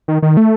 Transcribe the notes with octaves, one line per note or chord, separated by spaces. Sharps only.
D#3
D#3
A3